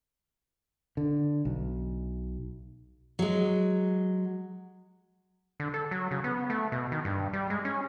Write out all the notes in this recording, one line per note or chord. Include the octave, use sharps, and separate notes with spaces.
D3
B1
F#3 G#3
D3
A4
F#3
C#3
B3
A3
B2
D#3
G2
G3
G#3
C#4